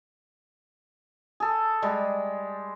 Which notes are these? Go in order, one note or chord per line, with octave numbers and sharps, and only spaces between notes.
G#4 A4
G3 G#3